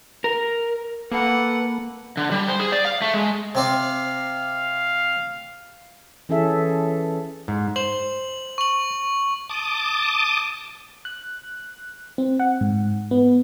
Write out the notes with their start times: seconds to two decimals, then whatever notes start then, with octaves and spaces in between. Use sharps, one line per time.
0.24 A#4
1.12 A#3 A4 B4 F#5
2.17 D3
2.32 G3
2.48 C5
2.60 G#4
2.72 D5
2.85 F5
3.02 A3
3.14 G#3
3.55 C3 C4 D5 F5
6.29 E3 C#4 G#4 A4 E5
7.48 G#2
7.76 C5 F#7
8.58 C#6 F#7
9.49 A5 D6 D#6
11.05 F#6
12.18 C4
12.40 F#5
12.61 G#2
13.11 B3